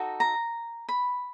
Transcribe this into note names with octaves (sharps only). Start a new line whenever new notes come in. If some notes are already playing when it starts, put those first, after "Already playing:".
Already playing: D#4 F#4 A4
A#5
B5